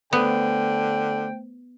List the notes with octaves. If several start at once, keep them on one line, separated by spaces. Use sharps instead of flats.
D3 A3 B3 C5 G5